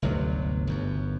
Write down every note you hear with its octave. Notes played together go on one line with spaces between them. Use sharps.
G1 D2 C3 F#3
G1 F#2